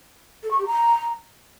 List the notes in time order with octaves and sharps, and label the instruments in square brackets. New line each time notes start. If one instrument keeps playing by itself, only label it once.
[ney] A4
C#6
G4
A#5